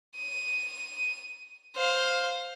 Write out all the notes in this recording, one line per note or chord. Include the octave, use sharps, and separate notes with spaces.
D#7
C5 F5